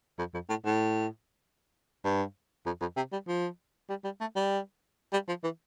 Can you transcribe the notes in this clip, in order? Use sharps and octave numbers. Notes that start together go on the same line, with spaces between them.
F2
F2
A2
A2
G2
F2
F2
C3
G3
F3
G3
G3
A3
G3
G3
F3
E3